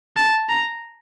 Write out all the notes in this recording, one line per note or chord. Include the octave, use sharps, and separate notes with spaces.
A5
A#5